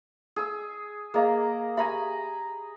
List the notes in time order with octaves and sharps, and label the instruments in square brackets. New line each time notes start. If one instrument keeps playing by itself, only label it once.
[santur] G#4 E6
[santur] A#3 A#5 [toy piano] G#4 D#5 F5
[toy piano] G4 E5 [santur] G#5 A#5 B5